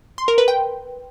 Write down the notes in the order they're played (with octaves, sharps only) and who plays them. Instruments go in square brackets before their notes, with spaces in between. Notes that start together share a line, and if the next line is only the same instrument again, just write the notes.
[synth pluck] C6
A#4
B4
G5